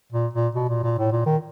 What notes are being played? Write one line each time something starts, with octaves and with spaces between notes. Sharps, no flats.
A#2
A#2
B2
A#2
A#2
A2
A#2
D#3